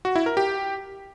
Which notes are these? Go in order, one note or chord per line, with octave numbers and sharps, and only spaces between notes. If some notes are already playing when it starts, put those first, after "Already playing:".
F#4
E4
A#4
G4